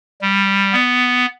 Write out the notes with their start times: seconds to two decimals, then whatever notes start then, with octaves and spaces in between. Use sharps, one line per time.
0.22 G3
0.72 B3